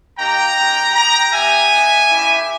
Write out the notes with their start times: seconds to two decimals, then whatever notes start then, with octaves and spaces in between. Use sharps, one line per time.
0.18 A#3 D#4 G4 G5 A#5
0.56 G#3 C#4 G4
0.94 B3 G4 G5 A#5
1.33 B3 G4 E5 G#5
1.71 B3 D#4 G4
2.09 A#3 C#4 E4 G4